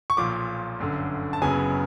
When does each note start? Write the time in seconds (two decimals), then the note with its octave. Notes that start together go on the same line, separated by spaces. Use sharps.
0.10 C#6
0.17 B1 A#2 F3 D6
0.79 G1 F#2 D3
1.33 A5
1.42 F#1 F#2 C#3 F#3 B3 G#5